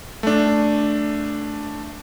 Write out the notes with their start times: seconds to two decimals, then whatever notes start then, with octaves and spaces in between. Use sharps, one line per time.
0.23 A3 D4